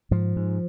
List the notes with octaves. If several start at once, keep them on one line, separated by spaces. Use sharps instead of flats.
G#2 F3
G#2